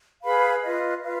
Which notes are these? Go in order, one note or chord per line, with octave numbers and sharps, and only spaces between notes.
G#4 B4 F5 B5
F4 B4 D#5
F4 B4 F5